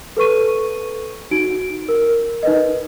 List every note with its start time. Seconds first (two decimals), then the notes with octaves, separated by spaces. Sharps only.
0.17 A4 B4 C#6 D#7
1.31 D#4 F#4 D7
1.89 A#4
2.43 D#4 B4 D#5